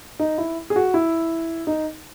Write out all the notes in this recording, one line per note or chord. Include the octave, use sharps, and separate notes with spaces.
D#4
E4
G#4
F#4
E4
D#4